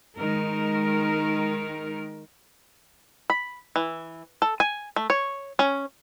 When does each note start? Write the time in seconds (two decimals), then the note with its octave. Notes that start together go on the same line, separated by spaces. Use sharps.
0.18 D#3 G#3 A#4
3.30 B5
3.76 E3
4.42 A4
4.60 G#5
4.96 A3
5.10 C#5
5.59 C#4